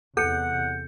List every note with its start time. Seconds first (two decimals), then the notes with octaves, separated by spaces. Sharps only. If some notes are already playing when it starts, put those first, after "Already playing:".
0.17 E2 C3 A4 F#5 G6 C#7